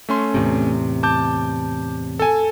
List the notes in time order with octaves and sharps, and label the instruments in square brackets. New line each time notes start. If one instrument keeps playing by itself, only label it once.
[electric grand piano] A3 C#4 C6
[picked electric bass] E2 A2 C3
[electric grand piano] A5 D6 G6
A4 G#5